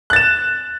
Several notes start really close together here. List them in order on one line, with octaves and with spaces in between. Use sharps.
F#6 A6 E7